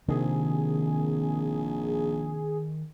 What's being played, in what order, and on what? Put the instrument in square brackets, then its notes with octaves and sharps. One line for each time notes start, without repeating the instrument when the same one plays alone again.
[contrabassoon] A#1 [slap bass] C3 [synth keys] D#3 [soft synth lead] G#4